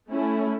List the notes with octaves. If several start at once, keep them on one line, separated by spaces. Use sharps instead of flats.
A3 C#4 E4